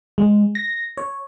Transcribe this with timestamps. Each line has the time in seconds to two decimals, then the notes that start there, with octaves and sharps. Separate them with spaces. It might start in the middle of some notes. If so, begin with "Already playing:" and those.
0.18 G#3
0.55 A#6
0.97 C#5